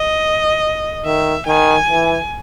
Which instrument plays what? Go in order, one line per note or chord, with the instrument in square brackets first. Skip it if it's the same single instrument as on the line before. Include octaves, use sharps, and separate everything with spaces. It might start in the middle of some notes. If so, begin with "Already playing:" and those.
Already playing: [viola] D#5
[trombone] D#3 [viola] E5
[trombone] D#3 [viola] G#5
[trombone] E3